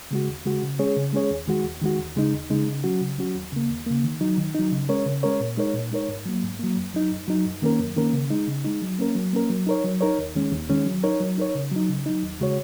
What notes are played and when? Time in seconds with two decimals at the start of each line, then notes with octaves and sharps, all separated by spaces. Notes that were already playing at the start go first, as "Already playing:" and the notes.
0.11 C#3 G#3 F#4
0.28 D#2
0.45 C#3 G#3 F#4
0.62 C#3
0.79 G#3 C#4 G#4 C#5
0.96 C#3
1.13 G#3 C#4 G#4 C#5
1.30 D#2
1.47 D#3 G#3 F#4
1.65 D#2
1.82 D#3 G#3 F#4
1.98 D#2
2.16 C#3 G#3 D#4
2.33 D#2
2.50 C#3 G#3 D#4
2.67 C#3
2.84 F#3 C#4 F#4
3.01 C#3
3.18 F#3 C#4 F#4
3.35 D#2
3.52 C#3 A#3
3.70 D#2
3.86 C#3 A#3
4.03 D#3
4.21 F#3 D#4
4.37 D#3
4.54 F#3 D#4
4.72 C#3
4.89 G#3 C#4 A#4 C#5
5.06 C#3
5.23 G#3 C#4 A#4 C#5
5.40 A#2
5.57 G#3 D#4 A#4 C#5
5.74 A#2
5.91 G#3 D#4 A#4 C#5
6.08 G#2
6.26 F#3 A#3
6.43 G#2
6.59 F#3 A#3
6.77 F#2
6.94 F#3 D#4
7.11 F#2
7.28 F#3 D#4
7.45 F#2
7.62 D#3 A#3 C#4 A#4
7.79 F#2
7.96 D#3 A#3 C#4 A#4
8.13 C#3
8.30 G#3 D#4
8.47 C#3
8.64 G#3 D#4
8.82 F#3
8.99 A#3 C#4 A#4
9.15 F#3
9.33 A#3 C#4 A#4
9.50 F#3
9.67 D#4 A#4 C#5
9.84 F#3
10.01 D#4 A#4 C#5
10.18 D#2
10.35 D#3 G#3 C#4
10.52 D#2
10.69 D#3 G#3 C#4
10.86 F#3
11.03 D#4 A#4 C#5
11.20 F#3
11.38 D#4 A#4 C#5
11.55 C#3
11.71 F#3 D#4
11.89 C#3
12.06 F#3 D#4
12.23 D#2
12.40 C#3 G#3 F#4 C#5